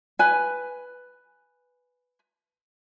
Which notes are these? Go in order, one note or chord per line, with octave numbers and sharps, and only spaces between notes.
B4 G#5